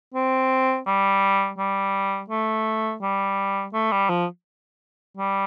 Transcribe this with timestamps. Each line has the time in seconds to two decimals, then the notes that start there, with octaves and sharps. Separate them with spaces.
0.14 C4
0.87 G3
1.58 G3
2.30 A3
3.02 G3
3.74 A3
3.92 G3
4.10 F3
5.17 G3